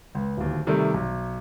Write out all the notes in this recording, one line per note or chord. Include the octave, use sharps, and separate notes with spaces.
C#2
D1 D#2
C3 D#3 G3 A3
B1